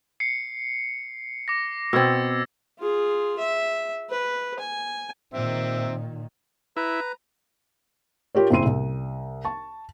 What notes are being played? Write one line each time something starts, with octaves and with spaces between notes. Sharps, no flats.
C7 C#7
D6 A#6
B2 C4 E6 G#6 A6
F4 G#4
E5
B4
G#5
A#2 D#3 C4 E5
E4 B4 A#5
F4 G4 A#4 C#5
F#1 C4 E4 C6 D#7
C2
A5 C#6